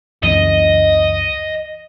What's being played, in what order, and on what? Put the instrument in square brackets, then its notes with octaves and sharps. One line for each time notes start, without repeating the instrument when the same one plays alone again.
[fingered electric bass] C#2 F#2 E3 [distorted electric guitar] D#5